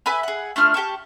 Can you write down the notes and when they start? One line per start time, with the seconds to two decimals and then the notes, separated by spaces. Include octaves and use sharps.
0.06 B4 E5 G#5 B5
0.23 G#4 F#5
0.56 A3 D4 F4 F6
0.74 G4 G5 A5 C#6